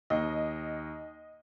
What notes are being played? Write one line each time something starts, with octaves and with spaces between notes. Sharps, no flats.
D#2 D#5